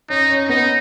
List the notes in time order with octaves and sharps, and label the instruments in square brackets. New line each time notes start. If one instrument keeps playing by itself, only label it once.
[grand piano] C#4 [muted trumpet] D#4
[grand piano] C#4
[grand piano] B3 [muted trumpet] D#4